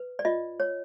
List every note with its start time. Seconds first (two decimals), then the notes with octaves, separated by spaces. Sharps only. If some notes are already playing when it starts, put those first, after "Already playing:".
Already playing: B4
0.19 D5
0.25 F4 D#5
0.60 C#5